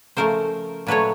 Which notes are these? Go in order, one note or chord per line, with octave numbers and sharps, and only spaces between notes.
C#3 F3 A3 A#4 C5
A#2 F#3 A3 B4 C#5